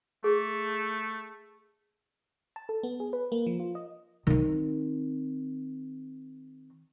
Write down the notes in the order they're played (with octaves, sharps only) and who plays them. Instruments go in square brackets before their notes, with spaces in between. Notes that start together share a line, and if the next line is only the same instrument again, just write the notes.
[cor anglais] A3 [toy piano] G#4
[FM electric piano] A5
A4
B3
G#4
B4
A#3
F3
F4
D#5
[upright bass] D#3 C4